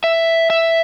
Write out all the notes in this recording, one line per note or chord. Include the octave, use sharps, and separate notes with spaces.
E5
E5